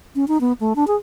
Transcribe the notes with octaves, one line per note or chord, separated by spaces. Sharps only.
C#4
D#4
B3
A3
D4
G#4